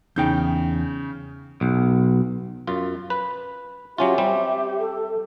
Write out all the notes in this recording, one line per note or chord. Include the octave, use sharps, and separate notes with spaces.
E2 C#3 D#4 G5 G6
B1
F#2 F4
B4
F#3 C#4 F4 G4 E5
G3 C4
A4